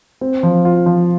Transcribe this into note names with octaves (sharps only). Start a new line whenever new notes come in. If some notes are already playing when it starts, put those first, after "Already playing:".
C4
F3
F4
F3